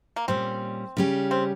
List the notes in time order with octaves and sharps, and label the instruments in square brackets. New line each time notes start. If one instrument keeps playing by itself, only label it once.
[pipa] A#3
[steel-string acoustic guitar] A#2 G3 C#4 [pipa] C4
[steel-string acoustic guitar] C#3 G3 C#4 G4
[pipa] C4